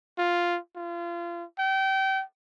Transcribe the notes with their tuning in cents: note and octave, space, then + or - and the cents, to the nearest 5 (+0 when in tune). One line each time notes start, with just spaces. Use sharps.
F4 +0
F4 -30
G5 -30